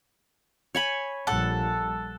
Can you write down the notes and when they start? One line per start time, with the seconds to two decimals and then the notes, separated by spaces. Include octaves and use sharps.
0.75 C#5 G#5 B5
1.27 A#1 G3 A4 F#5